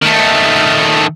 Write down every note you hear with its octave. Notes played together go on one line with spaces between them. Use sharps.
D#3 A3